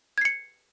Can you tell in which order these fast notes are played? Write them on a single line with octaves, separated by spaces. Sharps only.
G#6 C7 C#7